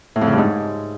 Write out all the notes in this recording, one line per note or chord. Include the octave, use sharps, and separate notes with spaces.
A2
F2
C#3
G2
G#2